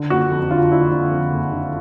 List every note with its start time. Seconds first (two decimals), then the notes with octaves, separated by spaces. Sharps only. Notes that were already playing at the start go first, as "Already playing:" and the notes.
Already playing: D3
0.10 F#1 F#4
0.31 F2
0.50 D3 F4
0.71 D3 E4
0.91 D3
1.11 F2
1.32 F#1
1.52 D3